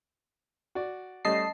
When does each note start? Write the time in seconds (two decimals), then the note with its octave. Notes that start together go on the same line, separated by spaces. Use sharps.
0.75 F#4 D5
1.25 G3 A3 C#4 D#5 A5 C7